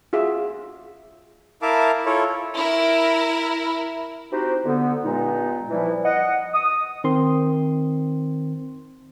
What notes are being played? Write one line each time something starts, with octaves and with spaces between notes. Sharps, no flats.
F4 F#4 G#4 E5
E4 A#4 E5 F5 A5 D6
E4 F4 A4 C#5
E4 A#4
C4 D#4 E4 F#4 G4 C5
D3 B3
G2 A#2 G#3 B3 D#4
E3 F3 G3 E4
D#5 F#5
D#6
D#3 C4 C6